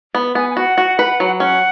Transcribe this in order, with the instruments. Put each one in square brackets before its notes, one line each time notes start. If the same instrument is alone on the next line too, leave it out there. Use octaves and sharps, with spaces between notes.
[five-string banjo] B3
[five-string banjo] B3 [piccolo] G#5
[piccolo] G#5
[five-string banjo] F#4 [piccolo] F#5
[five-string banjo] F#4
B4
F#3
[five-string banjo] C#4 [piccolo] F#5